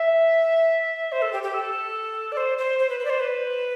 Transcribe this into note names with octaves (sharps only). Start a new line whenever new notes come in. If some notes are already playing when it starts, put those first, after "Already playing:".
Already playing: E5
C5
A4
G4
G4
A4
D5
C5
C5
C5
B4
B4
D5
C5
B4